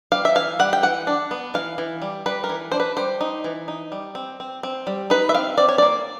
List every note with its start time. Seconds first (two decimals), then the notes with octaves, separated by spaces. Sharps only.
0.12 G3 F5
0.25 E5
0.35 E3 F5
0.59 G3 F#5
0.73 G5
0.83 E3 F#5
1.07 D4
1.31 B3
1.54 E3 F5
1.78 E3
2.02 G3
2.26 G3 B4
2.44 A#4
2.49 E3
2.72 D4 C5
2.80 B4
2.97 G3 C5
3.21 D#4
3.44 E3
3.68 D#4
3.92 G3
4.15 C4
4.40 C4
4.63 C4
4.87 G3
5.10 D#4 B4
5.29 E5
5.34 C4 F5
5.58 C4 D5
5.69 C#5
5.78 A#3 D5